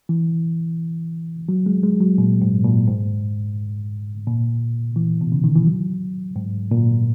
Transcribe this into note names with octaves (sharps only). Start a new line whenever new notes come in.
E3
F#3
G#3
G#3
F#3
A#2
G#2
A#2
G#2
A#2
E3
B2
C#3
D#3
E3
F#3
G#2
A#2